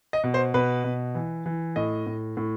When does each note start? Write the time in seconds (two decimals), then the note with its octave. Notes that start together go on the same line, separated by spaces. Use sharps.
0.13 D#5
0.24 B2
0.34 C5
0.54 B2 B4
0.84 B2
1.15 E3
1.46 E3
1.76 A2 D#5
2.06 A2
2.37 A2